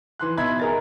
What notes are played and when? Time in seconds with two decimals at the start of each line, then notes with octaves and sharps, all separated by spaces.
0.19 E3 C6 F#6
0.38 B2 D#4 E5 B5 G#6
0.59 G#4 A#4 A6